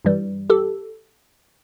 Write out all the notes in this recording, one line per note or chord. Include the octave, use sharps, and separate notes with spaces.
G2 E3 G3
G4 A4